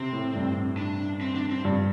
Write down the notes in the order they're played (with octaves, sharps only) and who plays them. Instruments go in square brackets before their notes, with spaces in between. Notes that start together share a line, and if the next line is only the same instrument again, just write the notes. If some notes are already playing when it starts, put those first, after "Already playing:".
Already playing: [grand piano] C3 [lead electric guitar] C4
[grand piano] A2
G2
[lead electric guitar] D4
C4
D4
C4
[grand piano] G2